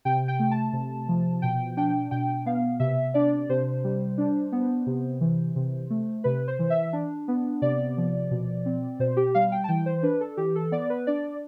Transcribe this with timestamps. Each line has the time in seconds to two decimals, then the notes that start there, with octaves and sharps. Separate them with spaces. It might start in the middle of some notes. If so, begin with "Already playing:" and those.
0.05 C3 G5
0.28 G5
0.39 A3
0.51 A5
0.73 C3
1.08 F3
1.42 B2 G5
1.77 D4 G5
2.11 B2 G5
2.46 B3 F5
2.80 C3 E5
3.14 D4 D5
3.49 C3 C5
3.84 G3
4.18 D4
4.52 B3
4.87 C3
5.21 E3
5.56 C3
5.90 A3
6.24 C3 B4
6.48 C5
6.59 E3
6.70 E5
6.93 D4
7.28 B3
7.62 C3 D5
7.97 F3
8.31 B2
8.66 C4
8.99 B2 C5
9.17 G4
9.35 G3 F5
9.52 G5
9.64 A5
9.69 E3 G5
9.86 C5
10.03 D4 B4
10.21 A4
10.37 E3 G4
10.55 A4
10.72 B3 D5
10.90 B4
11.07 D4 D5